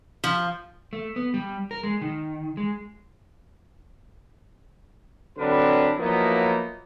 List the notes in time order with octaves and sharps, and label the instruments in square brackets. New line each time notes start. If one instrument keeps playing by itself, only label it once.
[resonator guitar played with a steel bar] F3
[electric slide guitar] A3
B3
G3
A#4
G#3
D#3
G#3
[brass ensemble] D3 F#3 C4 D4 A#4 B4
F3 F#3 A#3 B3 D#4 E4